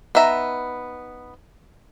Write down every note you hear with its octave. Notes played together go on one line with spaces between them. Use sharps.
B3 D#4 E5 G#5 A#5